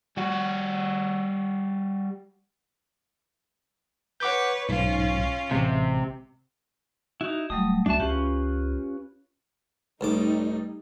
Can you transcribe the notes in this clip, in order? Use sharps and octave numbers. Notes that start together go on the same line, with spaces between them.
G3 F#4
B4 C#5 F#5 D6 G6
B1 G#2 C#4 F4
A1 C3 G#3
D#4 E4 F#4
D1 F#3 G3 A3 D#6
C#2 D4 F#4 E5 A5
C#2 C#4 F4 G4 B4
C#2 A2 G3 D#4 D6